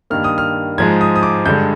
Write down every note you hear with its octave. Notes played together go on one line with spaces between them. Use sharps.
G2 D#3 A#3 F6
D#6
F6
G#2 F3 G#3 G#6
D#6
D#6
D6
G2 D3 G#3 G6